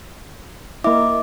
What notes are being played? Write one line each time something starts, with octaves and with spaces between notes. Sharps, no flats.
A#3 E4 D#5 E5 D6